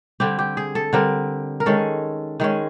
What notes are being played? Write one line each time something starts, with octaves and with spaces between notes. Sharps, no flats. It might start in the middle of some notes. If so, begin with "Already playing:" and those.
D3 G3 C4 G4
G4
G#4
A4
D3 G3 C4 A#4
A#4
D#3 G#3 C#4 A4
D#3 G#3 C#4